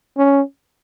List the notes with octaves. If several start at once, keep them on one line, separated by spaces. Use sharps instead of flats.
C#4